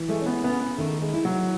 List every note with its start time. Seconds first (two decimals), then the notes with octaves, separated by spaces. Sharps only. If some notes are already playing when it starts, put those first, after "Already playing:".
Already playing: E3
0.08 G#3 A3
0.21 C#4
0.26 B3
0.44 C#3 B3
0.61 B3
0.78 D#3 A3
1.01 G#3
1.13 E4
1.25 F#3